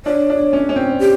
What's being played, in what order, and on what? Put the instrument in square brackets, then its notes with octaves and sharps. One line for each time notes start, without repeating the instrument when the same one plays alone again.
[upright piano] D4 [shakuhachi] C#5
[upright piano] D4
C#4
C#4
C4
[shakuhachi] G4